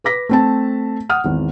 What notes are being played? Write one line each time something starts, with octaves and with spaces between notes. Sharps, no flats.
B4 D6 A#6 B6
A3 C4 A5
F#5 D#6 F6
G#1 E2